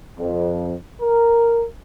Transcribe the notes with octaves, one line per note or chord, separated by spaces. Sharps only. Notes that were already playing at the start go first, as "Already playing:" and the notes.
F2
A#4